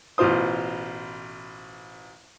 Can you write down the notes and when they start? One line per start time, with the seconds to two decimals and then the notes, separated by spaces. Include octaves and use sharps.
0.18 A1 B2 F4 C5 D#6